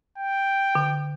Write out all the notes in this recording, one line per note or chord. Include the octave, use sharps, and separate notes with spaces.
G5
D3